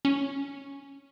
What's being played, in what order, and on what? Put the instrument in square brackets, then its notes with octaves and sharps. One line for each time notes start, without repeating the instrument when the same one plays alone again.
[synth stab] C#4